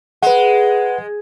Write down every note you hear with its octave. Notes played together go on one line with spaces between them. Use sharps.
G#3 B4 F#5